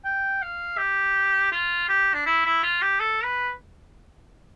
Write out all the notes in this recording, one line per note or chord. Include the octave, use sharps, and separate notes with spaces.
G5
F5
G4
F4
G4
D4
E4
E4
F4
G4
A4
B4